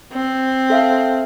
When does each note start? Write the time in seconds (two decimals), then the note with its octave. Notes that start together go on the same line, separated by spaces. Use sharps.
0.13 C4
0.70 A4 E5 F5